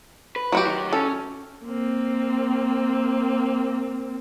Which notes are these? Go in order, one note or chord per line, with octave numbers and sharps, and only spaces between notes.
B4
F#3 F#4 G4
D#3
C#4 A4
A#3 C4